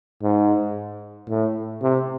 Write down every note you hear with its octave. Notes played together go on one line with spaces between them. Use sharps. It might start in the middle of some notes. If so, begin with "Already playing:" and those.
G#2
A2
C3